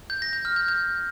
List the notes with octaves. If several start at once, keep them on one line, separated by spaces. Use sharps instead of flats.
G6
A#6
G6
F6
G6
G6